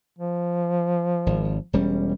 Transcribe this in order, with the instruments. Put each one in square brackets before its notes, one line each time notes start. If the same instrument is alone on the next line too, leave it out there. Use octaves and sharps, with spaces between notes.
[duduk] F3
[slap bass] G#1
E1 G3 C#4